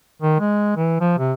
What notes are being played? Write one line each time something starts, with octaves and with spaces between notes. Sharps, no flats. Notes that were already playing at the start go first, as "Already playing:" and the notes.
D#3
G#3
E3
F3
C3